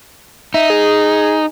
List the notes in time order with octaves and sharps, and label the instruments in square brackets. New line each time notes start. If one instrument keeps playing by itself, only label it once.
[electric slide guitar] D#4 [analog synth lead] E5
[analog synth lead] G#4